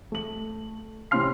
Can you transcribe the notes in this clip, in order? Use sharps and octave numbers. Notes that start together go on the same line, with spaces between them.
A3 F#7
A2 C3 C#4 C6 F6 C7